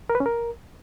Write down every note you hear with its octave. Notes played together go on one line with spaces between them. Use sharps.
A#4
B4
C#4
A#4